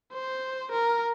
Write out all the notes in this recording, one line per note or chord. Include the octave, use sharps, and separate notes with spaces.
C5
A#4